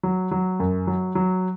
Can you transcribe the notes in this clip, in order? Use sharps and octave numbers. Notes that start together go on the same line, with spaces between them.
F#3
F#3
F#2
F#3
F#3